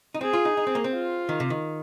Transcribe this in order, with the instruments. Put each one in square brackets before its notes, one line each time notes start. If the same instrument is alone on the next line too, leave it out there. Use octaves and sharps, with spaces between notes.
[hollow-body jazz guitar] D#4
[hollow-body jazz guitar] C4 [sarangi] G#4
[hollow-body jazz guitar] F4
D#4
D#4
C4
A#3
C4
[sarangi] F4
[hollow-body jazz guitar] D#3
C3
D#3